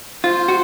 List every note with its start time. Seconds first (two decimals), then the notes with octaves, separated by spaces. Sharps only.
0.24 F4 C5
0.48 F#4